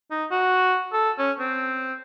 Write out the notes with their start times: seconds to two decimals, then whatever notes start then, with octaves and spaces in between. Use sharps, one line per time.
0.11 D#4
0.31 F#4
0.93 A4
1.19 C#4
1.40 C4